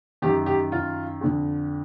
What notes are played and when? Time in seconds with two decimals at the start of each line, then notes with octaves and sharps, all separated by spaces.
0.22 F#2 D#3 G4
0.46 G4
0.72 F4
1.21 F2 D3